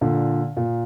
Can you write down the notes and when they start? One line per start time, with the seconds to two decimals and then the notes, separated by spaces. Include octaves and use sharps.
0.01 A#2 D3
0.57 A#2